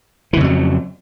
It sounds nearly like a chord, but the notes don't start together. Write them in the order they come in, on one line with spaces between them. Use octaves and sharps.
E3 C#3 F2 F#3